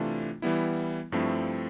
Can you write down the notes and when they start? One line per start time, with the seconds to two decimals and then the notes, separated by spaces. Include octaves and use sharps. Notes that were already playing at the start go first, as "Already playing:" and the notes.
Already playing: C3 E3 A3 D4 F4
0.42 E3 G3 B3 E4
1.12 G2 F3 A3 C4 E4